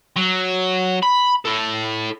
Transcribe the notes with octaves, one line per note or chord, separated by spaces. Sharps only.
F#3
B5
E4 A4